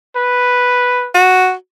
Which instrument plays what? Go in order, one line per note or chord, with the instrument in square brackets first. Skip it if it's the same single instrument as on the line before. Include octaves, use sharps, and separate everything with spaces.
[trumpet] B4
[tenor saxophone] F#4